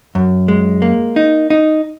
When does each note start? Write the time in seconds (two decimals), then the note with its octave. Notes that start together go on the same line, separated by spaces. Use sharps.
0.15 F#2
0.48 G#3
0.82 A#3
1.16 D#4
1.50 D#4